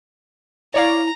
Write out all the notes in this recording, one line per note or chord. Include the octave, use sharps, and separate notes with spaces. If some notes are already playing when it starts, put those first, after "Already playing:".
E4 C#5 D5 F5 A#5